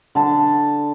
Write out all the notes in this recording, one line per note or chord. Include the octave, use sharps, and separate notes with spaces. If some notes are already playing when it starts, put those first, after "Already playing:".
D3 A5